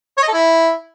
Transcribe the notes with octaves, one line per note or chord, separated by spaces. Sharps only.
C#5
D#5
A4
E4